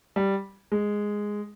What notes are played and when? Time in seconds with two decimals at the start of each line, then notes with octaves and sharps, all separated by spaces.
0.16 G3
0.72 G#3